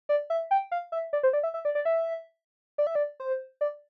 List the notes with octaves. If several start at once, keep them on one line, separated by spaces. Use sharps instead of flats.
D5
E5
G5
F5
E5
D5
C5
D5
E5
E5
D5
D5
E5
D5
E5
D5
C5
D5